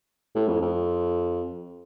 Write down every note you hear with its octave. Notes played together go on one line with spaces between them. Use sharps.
A2
F2
F2